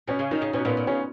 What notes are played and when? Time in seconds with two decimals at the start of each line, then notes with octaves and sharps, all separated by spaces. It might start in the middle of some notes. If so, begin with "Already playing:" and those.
0.08 B2 C#4
0.19 C#3
0.31 D#3 D#4
0.42 C#3
0.53 B2 C#4
0.65 A#2 B3
0.77 A#2
0.87 C#3 C#4